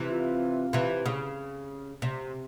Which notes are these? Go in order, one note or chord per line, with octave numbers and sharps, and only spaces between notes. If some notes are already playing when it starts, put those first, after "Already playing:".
Already playing: C3 E3
F4
C3 E3
C#3
C3